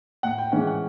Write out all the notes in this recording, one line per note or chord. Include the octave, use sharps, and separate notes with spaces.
A2 F#5
G5
E3 G#3 C#4 F#5
F#5